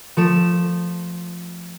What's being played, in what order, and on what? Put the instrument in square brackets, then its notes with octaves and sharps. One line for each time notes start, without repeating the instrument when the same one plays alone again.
[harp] F3 A3 D7 E7